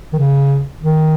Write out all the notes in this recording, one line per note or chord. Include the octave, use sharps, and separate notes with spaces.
D#3
C#3
D#3